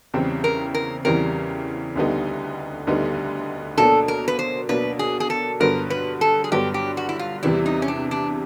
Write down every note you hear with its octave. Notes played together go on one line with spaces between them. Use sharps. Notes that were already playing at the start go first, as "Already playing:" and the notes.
E2 C#3 E3 G3 C4
A#4
A#4
E2 C#3 E3 G3 C4 A#4
D2 D3 G3 B3 D#4
D2 D3 G3 B3 D#4
B2 F#3 A#3 D4 A4
A#4
B4
C5
B2 F#3 A#3 D4 B4
G#4
G#4
A4
G2 D3 F#3 B3 A#4
B4
A4
G#4
G2 D3 F#3 B3 G4
G4
F#4
E4
F4
E2 C3 E3 G3 E4
D#4
C#4
D4
D4